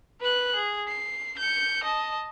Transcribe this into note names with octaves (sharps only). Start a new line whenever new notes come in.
B4 F#6
G#4
C7
G6 C#7
D#5 A5